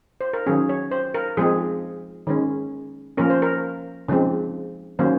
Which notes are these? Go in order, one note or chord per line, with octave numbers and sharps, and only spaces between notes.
C5
A#4
D#3 F#3 C#4 G#4
C#5
C5
A#4
F3 G#3 C4 G#4
D#3 G#3 C#4
F3 A#3 C#4 A#4
C5
A#4
C#3 F3 G#3 C4
D#3 F#3 A#3 C#4 C5